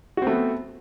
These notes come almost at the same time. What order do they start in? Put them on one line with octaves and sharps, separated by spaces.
F#4 C4 A3 B3